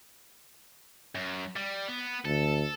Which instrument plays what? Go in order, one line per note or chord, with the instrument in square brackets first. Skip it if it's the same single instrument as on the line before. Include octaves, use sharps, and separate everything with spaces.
[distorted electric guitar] F#2
G3
B3
[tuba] D2 [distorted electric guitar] A4